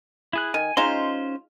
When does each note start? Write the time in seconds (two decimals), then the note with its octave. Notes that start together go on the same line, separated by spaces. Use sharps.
0.33 E4 G#4 F#6
0.54 D#3 G#5
0.77 G#3 C#4 D#4 F4 C5 C6